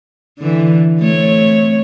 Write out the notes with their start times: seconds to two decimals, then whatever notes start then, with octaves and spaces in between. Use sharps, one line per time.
0.39 D3 E3
1.00 A3 C4 C#5